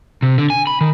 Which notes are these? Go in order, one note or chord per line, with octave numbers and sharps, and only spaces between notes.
C3
D3
G#5
B5
D#3